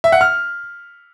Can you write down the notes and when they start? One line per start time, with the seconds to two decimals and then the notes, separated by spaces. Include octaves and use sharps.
0.04 E5
0.12 F#5
0.21 F6